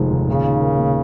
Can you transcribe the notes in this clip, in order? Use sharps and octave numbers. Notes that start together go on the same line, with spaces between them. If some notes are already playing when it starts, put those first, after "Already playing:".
Already playing: F1 D#3 F3 G#3
D#2
A#2 C#3
D#4
A#4
A#3